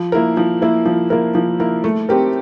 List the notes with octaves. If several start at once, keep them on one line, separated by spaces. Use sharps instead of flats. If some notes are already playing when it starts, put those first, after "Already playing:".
Already playing: F3
A#3 E4 A#4
F3
A#3 E4 A#4
F3
A#3 E4 A#4
F3
A#3 E4 A#4
A3
C4 G4 A#4